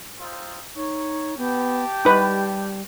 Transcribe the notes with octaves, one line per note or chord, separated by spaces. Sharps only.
C4 D#4 F4
D#4 C#5
B3 G4 G5 A5
G3 D#4 B4